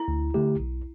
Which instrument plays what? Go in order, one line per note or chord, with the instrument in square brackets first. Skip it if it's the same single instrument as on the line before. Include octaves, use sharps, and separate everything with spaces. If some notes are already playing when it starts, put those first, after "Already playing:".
Already playing: [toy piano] E4
[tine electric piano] D2
D3 A3 G4
B1